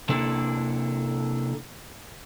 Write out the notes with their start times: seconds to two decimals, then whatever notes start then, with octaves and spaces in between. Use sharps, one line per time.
0.09 C3 A#3 D4 E4 A4